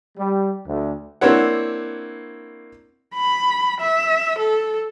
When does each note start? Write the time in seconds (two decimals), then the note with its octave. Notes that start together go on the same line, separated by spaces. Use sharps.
0.18 G3
0.67 D2
1.21 A#3 C4 D4 E4 C#5 F#5
3.15 B5
3.81 E5
4.39 A4